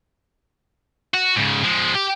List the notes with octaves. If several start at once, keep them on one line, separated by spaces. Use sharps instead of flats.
F#4
G#2 C#3
F3 G#3
G4